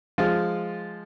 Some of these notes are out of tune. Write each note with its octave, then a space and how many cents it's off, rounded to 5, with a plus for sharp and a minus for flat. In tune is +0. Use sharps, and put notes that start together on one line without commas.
F3 +0 G#3 +0 F4 +0